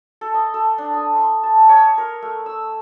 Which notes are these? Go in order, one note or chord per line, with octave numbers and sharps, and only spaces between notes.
A4
D#5
A4
D4
D#6
C6
A5
C#5
A#4
A3
E6